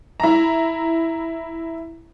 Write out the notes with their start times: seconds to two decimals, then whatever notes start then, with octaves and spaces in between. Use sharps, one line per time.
0.20 E4 A#5